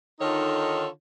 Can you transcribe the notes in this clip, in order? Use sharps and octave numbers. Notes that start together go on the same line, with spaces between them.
D3 D#3 D#4 F4 A4 C#5